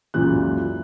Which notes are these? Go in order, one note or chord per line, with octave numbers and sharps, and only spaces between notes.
C#2 F#2 A#2 E3 F#6